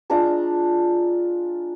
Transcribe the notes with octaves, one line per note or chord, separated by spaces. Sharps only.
G#3 D4 F4 A#5